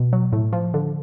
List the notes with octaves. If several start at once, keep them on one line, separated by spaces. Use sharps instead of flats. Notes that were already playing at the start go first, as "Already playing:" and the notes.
Already playing: B2
F#3
A2
F3
D3